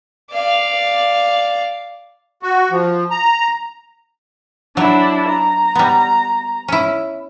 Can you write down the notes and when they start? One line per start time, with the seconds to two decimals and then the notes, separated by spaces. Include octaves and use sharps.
0.33 D5 F5
2.43 F#4
2.71 F3
3.11 A#5
4.77 F#3 D4 E4
5.28 A#5
5.75 G3 B3
6.68 C#4 E4